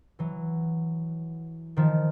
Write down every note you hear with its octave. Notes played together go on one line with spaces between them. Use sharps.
E3 F#3
D#3 F3